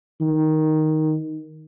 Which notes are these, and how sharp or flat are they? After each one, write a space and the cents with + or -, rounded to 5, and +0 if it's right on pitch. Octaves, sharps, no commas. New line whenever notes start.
D#3 +5